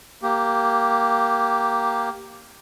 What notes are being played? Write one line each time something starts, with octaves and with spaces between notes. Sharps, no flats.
A#3 G4